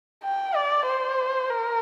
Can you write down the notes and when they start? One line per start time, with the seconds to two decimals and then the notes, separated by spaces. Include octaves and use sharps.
0.24 G5
0.55 D5
0.87 C5
1.50 A#4